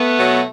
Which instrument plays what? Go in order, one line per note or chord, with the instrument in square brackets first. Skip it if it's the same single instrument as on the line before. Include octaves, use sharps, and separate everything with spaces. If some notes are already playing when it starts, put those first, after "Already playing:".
Already playing: [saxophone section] A3 B3
B2 F#3